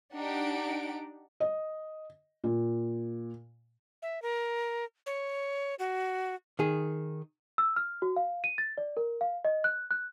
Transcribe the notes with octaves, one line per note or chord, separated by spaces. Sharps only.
D4 D#4 G4 F#5 D7
D#5
A#2
E5
A#4
C#5
F#4
D#3 G#4
E6
F6
F#4
F5
D#7
A6
D5
A#4
F5
D#5
F#6
F#6